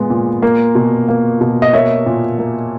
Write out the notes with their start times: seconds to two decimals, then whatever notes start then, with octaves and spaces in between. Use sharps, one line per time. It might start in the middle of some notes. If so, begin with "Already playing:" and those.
Already playing: A#2 G#3 B3
0.10 A#2
0.42 A#3
0.75 B2
1.09 A#3
1.41 B2
1.62 D#5
1.73 A#3 C#5 E5
2.06 A#2
2.39 A#3